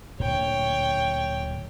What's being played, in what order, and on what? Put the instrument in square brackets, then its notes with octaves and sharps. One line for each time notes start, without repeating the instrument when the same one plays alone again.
[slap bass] D1 A#2 D3 [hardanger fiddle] C#5 G5